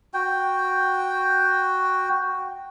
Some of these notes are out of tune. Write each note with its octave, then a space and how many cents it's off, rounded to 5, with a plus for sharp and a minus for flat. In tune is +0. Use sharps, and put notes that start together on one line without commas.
F#4 +0 G5 +0